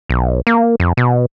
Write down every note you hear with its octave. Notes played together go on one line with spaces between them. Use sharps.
B1
A#3
F2
B2